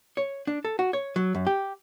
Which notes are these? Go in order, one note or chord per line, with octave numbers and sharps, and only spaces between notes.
C#5
D4
A4
F#4
C#5
F#3
F#2
G4